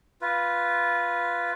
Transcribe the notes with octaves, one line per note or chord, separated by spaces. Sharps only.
F4 B4